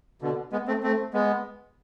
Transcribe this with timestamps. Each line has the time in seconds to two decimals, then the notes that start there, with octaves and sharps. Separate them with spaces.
0.22 B2 D3
0.52 G#3 B3
0.67 A3 C4
0.83 A3 C4
1.13 G#3 B3